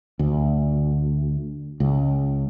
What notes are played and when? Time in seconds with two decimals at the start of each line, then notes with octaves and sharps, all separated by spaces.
0.19 D2
1.80 C#2